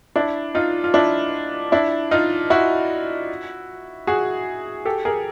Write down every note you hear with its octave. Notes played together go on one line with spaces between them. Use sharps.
D4 E4
D#4 F4
F4
D4 E4
D4 E4
D#4 F4
E4 F#4
F#4 G#4
G4 A4
G#4 A#4